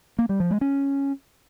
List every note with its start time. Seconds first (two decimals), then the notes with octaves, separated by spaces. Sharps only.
0.19 A#3
0.29 G3
0.40 F3
0.51 G#3
0.61 C#4